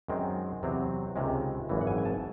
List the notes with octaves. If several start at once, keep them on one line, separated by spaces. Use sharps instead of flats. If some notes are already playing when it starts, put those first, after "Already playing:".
F#2 D#3 G#3 C4
E2 C3 F#3 C4
C#2 C3 D#3 G#3
G#1 F#2 C#3 E3
F#5
G#5
G#5
A5